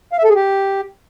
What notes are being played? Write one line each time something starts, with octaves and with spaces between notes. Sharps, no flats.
F5
E5
A4
G#4
G4